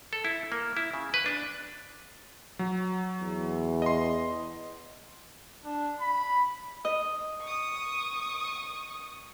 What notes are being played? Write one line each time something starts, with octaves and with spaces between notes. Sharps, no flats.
A4
E4
A#3
E4
C#3
B4
D4
F#3
E2
D#5 C6
D4
B5
D#5
C#6 D#6